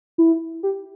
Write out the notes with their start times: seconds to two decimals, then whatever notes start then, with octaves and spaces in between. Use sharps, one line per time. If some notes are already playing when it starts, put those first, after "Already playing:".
0.18 E4
0.63 G4